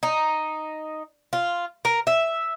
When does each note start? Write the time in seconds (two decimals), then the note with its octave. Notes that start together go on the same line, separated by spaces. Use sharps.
0.03 D#4
1.33 F4
1.85 A#4
2.07 E5